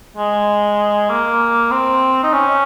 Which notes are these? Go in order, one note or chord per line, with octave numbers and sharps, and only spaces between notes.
G#3
A#3
C4
D#4
C#4